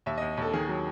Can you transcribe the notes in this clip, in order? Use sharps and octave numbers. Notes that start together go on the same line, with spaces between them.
D#2 E5
D#5
D#2
D#2 A4
D#3 G#4
F#3